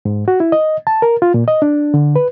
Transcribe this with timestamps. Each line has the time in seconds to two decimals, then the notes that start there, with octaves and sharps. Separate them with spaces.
0.05 G#2
0.28 F#4
0.40 E4
0.52 D#5
0.87 A5
1.02 A#4
1.22 F4
1.34 A#2
1.48 D#5
1.62 D4
1.94 D3
2.16 B4